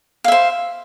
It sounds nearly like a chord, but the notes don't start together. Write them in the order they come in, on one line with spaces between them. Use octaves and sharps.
F5 E5 C5